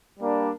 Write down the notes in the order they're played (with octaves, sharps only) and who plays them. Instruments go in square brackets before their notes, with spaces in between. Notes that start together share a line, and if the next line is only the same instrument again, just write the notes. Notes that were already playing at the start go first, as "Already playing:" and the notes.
[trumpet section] G3 A#3 D4